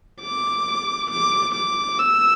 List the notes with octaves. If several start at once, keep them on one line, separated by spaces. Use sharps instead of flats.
D6
D6
D6
E6